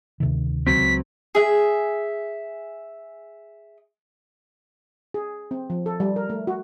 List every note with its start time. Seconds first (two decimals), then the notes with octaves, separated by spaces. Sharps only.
0.20 D2 C3 D#3
0.67 C#2 F#3 C4 B6
1.35 G#4 E5
5.14 G#4
5.51 C4
5.70 F3
5.86 A4
6.00 G3
6.16 A#4
6.30 A3
6.47 F#4